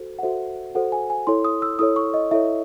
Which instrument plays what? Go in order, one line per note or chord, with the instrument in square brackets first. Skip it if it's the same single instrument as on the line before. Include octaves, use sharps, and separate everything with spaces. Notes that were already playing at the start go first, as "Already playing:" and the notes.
Already playing: [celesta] F#4 A4 C5
F#5
F#4 A4 C5 E5
F#4 A4 C5 F#5
G#5
G#5
E4 A4 C#5 C6
D#6
E6
E4 A4 C#5 D#6
C#6
D#5
E4 A4 C#5 E5